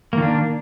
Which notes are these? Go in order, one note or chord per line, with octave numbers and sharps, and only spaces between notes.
D#3 A#3 D4